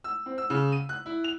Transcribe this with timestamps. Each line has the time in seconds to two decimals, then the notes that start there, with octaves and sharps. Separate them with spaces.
0.04 E6
0.26 C4
0.38 E6
0.50 C#3
0.72 D#7
0.89 F#6
1.06 E4
1.24 F7